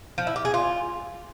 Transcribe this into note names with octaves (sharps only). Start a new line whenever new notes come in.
F3
E4
G4
G#4
F4